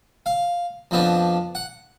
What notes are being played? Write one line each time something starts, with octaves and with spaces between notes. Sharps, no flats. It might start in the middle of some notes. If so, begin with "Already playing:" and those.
F5
F2 F3 B3 D4
F#5